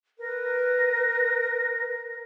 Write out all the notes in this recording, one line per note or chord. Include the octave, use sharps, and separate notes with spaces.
A#4 B4